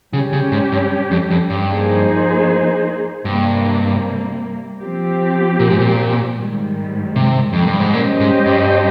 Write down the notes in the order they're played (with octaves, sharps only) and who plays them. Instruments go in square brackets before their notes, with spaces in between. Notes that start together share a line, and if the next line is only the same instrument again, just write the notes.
[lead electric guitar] C#3 [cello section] G3
[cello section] C#4 G4
[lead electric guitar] C#3
G#2
G2
F2
F2
G2
[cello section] F3 A#3 D#4 G#4 C5
[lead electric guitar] G2 [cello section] C3 G3 A#3
[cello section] F3 C4 G4
[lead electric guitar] A#2
G#2
A#2
[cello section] G#2 D#3 G3
[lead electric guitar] C3
F2
G2
G#2
[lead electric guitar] A#2 [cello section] G3 C#4 G4 C5 D#5
[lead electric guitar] G#2
G2